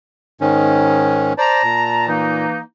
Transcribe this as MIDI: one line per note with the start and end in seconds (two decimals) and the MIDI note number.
0.41 1.33 44
0.41 1.33 51
0.41 1.33 61
1.38 1.63 72
1.38 1.63 74
1.38 2.04 81
1.38 2.04 82
1.63 2.46 46
2.08 2.59 52
2.08 2.59 58
2.08 2.59 63